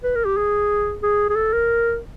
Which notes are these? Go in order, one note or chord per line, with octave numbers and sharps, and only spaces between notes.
B4
A#4
G4
G#4
G#4
G#4
A4
A#4